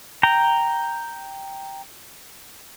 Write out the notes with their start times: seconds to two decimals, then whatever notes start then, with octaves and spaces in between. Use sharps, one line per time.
0.23 G5 A#5